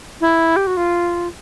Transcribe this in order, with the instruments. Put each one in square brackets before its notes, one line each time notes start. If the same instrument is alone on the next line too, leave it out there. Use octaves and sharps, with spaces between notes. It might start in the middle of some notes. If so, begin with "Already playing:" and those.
[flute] E4
G4
F#4
F4